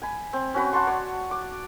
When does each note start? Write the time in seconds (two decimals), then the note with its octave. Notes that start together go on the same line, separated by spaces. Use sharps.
0.02 G#5 B5
0.33 C4
0.54 C#4 F#4 B4
0.72 F#5 A5 C6 C#6
0.87 C#5 D5
1.31 D6